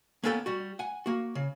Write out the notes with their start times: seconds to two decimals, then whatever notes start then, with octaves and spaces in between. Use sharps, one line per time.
0.23 A#3 B3 C#4 A4 B4 G5
0.46 G3 F#4
0.79 F#5 G#5
1.06 A#3 F#4
1.35 C#3